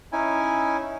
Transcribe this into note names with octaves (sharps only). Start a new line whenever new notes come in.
C#4 D#4 E4 G#5